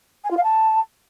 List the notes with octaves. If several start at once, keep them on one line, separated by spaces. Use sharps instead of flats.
G#5
F4
F5
A5